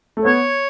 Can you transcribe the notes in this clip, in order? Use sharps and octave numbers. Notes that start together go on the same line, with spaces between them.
A3
B3 C#5